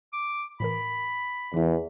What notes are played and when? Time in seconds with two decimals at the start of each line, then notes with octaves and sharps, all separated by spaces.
0.13 D6
0.60 A2 E3 A#4 B5
1.54 E2 E3 E4